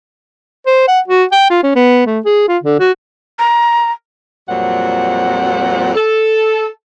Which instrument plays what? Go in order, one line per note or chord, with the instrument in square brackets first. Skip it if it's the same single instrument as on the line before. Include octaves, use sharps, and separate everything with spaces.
[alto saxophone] C5
F#5
F#4
G5
F4
C#4
B3
A3
G#4
F4
D3
F#4
[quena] A#5
[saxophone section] F2 A#2 F#3 G3 C4 F#5
A4